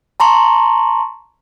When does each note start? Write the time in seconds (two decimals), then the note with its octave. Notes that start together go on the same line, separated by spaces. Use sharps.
0.20 A5 A#5 C6 C#6